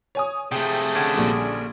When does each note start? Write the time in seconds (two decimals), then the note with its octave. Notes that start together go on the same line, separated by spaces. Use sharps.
0.15 C#5 G#5 D#6
0.52 C3 A3 G#4 G5
0.95 D3 C#4 D4
1.14 A#1 A#2 G3